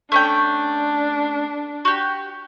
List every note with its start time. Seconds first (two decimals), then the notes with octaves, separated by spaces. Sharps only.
0.12 A3 C#4 D4 G5
1.85 F#4 G4